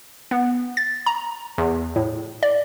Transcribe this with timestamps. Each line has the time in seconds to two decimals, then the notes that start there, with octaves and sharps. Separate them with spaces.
0.31 B3
0.77 A6
1.06 A#5
1.58 E2
1.96 A2
2.43 D5